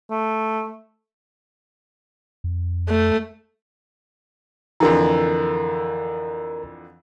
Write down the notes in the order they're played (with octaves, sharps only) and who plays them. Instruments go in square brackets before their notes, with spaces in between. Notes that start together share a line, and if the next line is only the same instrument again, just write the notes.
[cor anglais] A3
[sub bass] F2
[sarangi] A3
[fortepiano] F2 D3 E3 [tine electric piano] A#4 A#5